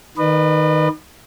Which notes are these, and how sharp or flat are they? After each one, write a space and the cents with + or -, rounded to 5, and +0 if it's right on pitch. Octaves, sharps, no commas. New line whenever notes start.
D#3 +0 B4 +0 D#5 -45